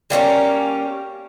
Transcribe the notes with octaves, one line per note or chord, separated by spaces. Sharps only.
G3 A#3 C4 C#4